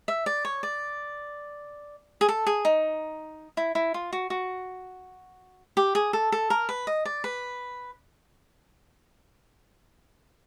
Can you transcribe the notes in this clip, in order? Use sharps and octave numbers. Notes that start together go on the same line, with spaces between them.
E5
D5
C#5
D5
G#4
A4
G#4
D#4
E4
E4
F4
F#4
F#4
G4
G#4
A4
A4
A#4
B4
D#5
D5
B4